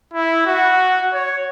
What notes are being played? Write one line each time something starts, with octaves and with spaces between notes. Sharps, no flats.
E4
F#4
C#5